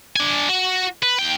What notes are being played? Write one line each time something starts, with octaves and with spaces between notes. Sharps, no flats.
D4 G#5
F#4
B4
D#2 G5